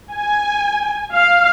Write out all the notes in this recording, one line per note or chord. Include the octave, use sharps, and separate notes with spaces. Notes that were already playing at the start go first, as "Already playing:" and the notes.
G#5
F5